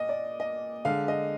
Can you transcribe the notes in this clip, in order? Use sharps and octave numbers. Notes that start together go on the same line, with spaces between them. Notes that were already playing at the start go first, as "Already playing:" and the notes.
Already playing: A#2 D#5
D5
D#5
D3 G#3 F5
D#5